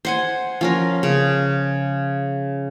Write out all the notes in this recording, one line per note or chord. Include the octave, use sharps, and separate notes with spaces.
C5 F#5 G#5
F3 C#4 A#4
C#3